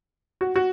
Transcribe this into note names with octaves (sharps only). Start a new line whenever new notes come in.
F#4
F#4